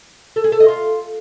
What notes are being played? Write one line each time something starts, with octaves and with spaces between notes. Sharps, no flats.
A4
G#4
A4
D#5
F4